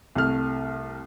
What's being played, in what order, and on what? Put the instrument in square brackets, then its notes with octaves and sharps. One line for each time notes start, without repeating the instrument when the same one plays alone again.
[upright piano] C2 A3 F6